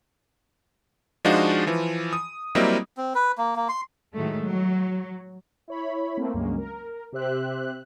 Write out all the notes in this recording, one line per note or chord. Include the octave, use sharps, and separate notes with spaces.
F3 G#3 D4 D#4 F4 F#4
E3 F3
D#6
F#3 G3 A#3 C4 E4 D#5
C4
B4
A#3
A#3
C6
A2 D#3 F#3 G#3 A3
F#3
E4 C#5 B5
A3 A#3 C4
C#2 G2 F#3 G#3 A#3 C#4
A#4
C3 G4 C5 E5 F#6